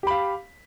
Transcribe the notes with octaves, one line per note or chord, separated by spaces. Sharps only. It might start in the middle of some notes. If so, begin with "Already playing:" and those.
G4 F5 B5